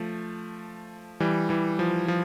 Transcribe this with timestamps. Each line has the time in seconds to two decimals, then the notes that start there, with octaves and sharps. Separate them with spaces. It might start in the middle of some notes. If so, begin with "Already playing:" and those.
Already playing: F3 A3
1.20 E3 G3
1.49 E3 G3
1.79 F3
2.08 F3